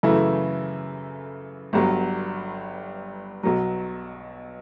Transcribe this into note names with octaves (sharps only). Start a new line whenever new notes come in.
F#2 C#3 E3 A3 E4
G1 G2 F#3
B1 B2 F#3